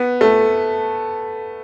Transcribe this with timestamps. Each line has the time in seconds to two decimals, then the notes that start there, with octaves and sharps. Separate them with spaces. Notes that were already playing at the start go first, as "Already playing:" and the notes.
Already playing: B3
0.21 A3